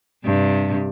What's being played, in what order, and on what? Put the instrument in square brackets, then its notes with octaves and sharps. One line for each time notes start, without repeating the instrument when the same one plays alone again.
[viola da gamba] G2 C3 G3